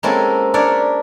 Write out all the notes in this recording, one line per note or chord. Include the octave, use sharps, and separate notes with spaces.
G#3 A#3 C4 C#4 E4 A4
D4 A#4 C#5 D5 E5